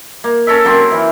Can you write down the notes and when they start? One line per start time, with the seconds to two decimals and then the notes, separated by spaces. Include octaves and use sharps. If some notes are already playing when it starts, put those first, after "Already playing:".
0.24 A#3
0.47 C#4 A4 A#4 E5
0.65 F#3 A#3 C4
0.92 E3